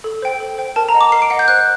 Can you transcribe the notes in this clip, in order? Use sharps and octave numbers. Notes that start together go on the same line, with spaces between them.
A4
C5 G5
A4
C5 G5
A#4 A5
A#5
D#5 F#5
D6
A#4 C7
D7
D#5 F#5 C7
G6
C5 F#6